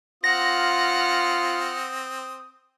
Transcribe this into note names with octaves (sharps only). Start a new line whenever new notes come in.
C4 F4 F#5 D#6 F6 A#6